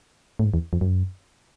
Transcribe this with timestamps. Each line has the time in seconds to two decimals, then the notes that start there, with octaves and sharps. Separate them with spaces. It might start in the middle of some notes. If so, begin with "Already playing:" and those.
0.39 A2
0.45 G#2
0.54 E2
0.73 F2
0.81 F#2